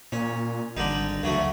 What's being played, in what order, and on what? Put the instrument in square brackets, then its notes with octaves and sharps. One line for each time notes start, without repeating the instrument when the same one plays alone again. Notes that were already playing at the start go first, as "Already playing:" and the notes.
[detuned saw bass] A#2 [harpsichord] C#4
[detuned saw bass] G#1 [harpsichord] D3 G3 D#4
[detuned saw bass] D2 [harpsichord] C#3 F#3 A3